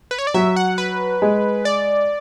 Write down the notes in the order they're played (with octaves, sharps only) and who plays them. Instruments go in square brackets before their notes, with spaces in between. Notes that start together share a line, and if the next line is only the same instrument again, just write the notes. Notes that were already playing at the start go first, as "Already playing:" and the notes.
[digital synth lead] B4
C#5
D5
[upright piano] F#3 [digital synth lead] E5
[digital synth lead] F#5
B4
[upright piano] G#3
[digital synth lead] D5